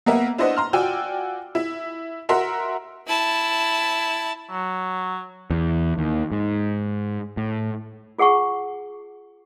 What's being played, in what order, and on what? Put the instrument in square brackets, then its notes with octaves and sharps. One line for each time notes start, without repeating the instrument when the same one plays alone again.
[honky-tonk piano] A#3 B3 A#4 E5 F#5
D4 E4 B4 C5 D#5 F#5
A#5 C6 F6
F4 F#4 D5 G5 G#5 E6
E4
F#4 A#4 E5 F#5 C6
[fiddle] E4 A5
[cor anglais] F#3
[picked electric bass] E2
D#2
G#2
A2
[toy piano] F4 G#4 F#5 A5 C#6